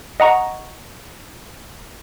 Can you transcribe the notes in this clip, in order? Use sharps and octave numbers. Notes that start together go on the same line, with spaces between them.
D#5 F#5 A#5 C#6